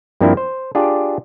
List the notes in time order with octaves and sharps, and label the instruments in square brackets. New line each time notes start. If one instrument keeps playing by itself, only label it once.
[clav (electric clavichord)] G2 F3 A#3 C4 D4 E4
C5
D4 F4 G4 G#4 D5